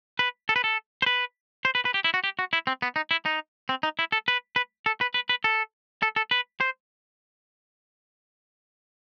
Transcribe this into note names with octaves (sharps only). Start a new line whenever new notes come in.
B4
A4
B4
A4
C5
B4
C5
B4
B4
G4
E4
F#4
G4
F#4
E4
C4
B3
D#4
E4
D#4
C4
D#4
E4
A4
B4
B4
A4
B4
B4
B4
A4
A4
A4
B4
C5